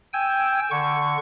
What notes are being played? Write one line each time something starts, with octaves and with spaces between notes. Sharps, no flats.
G5 G#5 E6
D3 C#6